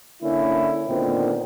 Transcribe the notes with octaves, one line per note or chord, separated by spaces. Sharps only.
D3 A#3 C#4 E4
A#2 D3 D#3 B3 C4